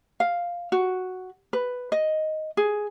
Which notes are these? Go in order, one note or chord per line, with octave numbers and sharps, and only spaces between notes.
F5
F#4
B4
D#5
G#4